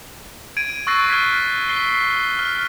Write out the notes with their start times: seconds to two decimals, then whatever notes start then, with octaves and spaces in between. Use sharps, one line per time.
0.57 G#6 D7 D#7
0.87 C#6 E6 F#6 A6 A#6 C7
1.10 C#6 F6 F#6 G#6 B6
1.68 B6 C7 G7
2.39 F6